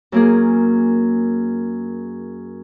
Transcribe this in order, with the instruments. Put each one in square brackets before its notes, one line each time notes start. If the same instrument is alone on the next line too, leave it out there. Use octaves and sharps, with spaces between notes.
[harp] F#2 A#3 G#4